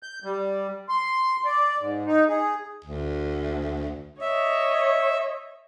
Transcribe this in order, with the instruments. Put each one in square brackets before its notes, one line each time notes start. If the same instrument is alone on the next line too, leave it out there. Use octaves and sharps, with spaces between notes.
[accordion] G6
G3
C6
D5
G#2
D#4
G#4
[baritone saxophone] D2
[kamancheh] C#5 D#5 [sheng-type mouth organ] E5